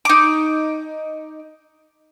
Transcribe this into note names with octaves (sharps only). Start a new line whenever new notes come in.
D#4 D6